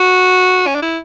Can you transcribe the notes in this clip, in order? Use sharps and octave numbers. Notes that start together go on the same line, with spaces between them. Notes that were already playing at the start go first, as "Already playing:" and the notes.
Already playing: F#4
C#4
D4
E4